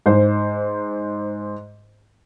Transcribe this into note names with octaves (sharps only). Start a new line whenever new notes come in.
G#2 C5